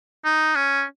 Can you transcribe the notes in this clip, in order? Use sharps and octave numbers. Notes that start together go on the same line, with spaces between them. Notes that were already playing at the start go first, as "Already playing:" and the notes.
D#4
C#4